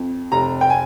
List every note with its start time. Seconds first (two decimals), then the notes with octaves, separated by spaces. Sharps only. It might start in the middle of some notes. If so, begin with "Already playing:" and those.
Already playing: F2
0.32 F1 A#5
0.61 G5
0.70 G#5